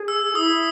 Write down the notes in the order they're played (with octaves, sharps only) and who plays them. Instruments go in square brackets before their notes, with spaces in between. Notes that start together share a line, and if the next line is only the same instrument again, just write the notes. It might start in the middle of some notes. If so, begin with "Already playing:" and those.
Already playing: [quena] G#4
[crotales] E6
[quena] E4 [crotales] D#6